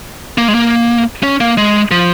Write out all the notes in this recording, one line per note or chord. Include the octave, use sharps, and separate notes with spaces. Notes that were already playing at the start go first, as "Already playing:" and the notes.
A#3
G#3
A#3
C#4
A#3
G#3
F3